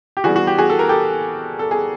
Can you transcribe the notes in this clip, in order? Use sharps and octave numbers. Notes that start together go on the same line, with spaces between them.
G4
E3 G3 B3 F#4 G#4
F#4
G4
F#4 G#4
A4
A#4
G4 A4
A4
G#4